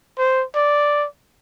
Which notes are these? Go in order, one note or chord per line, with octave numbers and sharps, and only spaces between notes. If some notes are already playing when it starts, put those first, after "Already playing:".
C5
D5